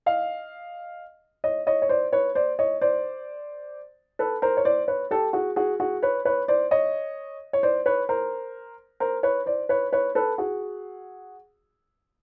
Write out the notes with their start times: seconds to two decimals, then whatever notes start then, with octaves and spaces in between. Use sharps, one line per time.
0.06 D#5 F5
1.44 C#5 D#5
1.67 C#5 D#5
1.82 C#5
1.89 C5 D5
2.13 B4 C#5
2.35 C5 D5
2.59 C#5 D#5
2.81 C5 D5
4.19 A4 B4
4.42 A#4 C5
4.57 C#5
4.65 C5 D5
4.88 B4 C#5
5.11 G4 A4
5.33 F#4 G#4
5.56 F#4 G#4
5.80 F#4 G#4
6.03 B4 C#5
6.25 B4 C#5
6.48 C5 D5
6.71 C#5 D#5
7.53 C#5
7.63 C5 D5
7.86 B4 C#5
8.09 A#4 C5
9.00 A#4 C5
9.23 B4 C#5
9.46 C5 D5
9.69 B4 C#5
9.92 B4 C#5
10.15 A4 B4
10.38 F#4 G#4